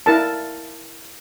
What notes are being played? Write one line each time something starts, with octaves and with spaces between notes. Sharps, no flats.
E4 A#4 A5